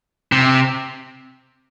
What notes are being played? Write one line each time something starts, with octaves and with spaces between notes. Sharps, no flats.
C3